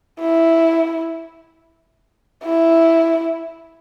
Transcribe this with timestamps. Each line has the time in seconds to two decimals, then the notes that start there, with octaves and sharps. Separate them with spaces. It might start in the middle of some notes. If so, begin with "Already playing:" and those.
0.20 E4
2.44 E4